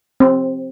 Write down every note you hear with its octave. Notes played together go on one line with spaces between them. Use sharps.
C4